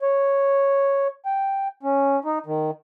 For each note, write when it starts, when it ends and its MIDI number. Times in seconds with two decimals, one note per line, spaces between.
0.02 1.08 73
1.26 1.68 79
1.83 2.20 61
2.25 2.39 63
2.46 2.71 51